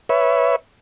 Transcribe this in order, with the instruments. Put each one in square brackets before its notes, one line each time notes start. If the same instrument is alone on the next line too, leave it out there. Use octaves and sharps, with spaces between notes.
[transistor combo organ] B4 C#5 E5